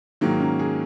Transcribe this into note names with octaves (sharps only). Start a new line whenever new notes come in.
G#2 D#3 F#3 A#3
C#4
G#4